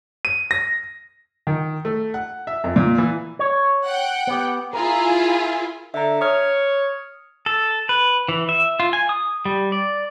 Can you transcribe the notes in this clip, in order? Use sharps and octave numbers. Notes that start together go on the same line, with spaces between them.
D#7
A#6
D#3
A3
F#5
E5
F2
A#2
E3
C#5
F#5 G5
B3 G4
E4 F4 G#4 A#4
D3 E5 A#5
C#5 D#6 F6
A4
B4
E3
E5
F4
G#5
D#6
G3
D5